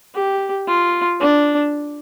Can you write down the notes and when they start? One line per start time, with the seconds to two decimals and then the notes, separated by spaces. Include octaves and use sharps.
0.15 G4
0.68 F4
1.20 D4